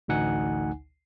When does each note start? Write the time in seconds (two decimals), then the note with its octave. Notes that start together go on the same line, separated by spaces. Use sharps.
0.08 A1 D2 D#4 F#5 G#5